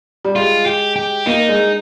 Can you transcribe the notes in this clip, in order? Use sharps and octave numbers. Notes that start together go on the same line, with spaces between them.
G3
G#3 F4
G4
G4
A#3 D#4
G#3